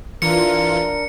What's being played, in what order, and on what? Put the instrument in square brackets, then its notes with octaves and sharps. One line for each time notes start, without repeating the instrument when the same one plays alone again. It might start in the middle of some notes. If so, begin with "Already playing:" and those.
[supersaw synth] E3 F4 [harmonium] D4 A#4 [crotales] C#7